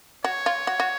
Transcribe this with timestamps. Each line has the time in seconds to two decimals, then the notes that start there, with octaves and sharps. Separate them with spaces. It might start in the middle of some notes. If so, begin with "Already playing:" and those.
0.24 F#4 C#5
0.46 F4
0.67 F#4
0.80 F#4